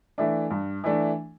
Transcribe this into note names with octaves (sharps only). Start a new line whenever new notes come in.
E3 A3 D4
G2
E3 A3 D4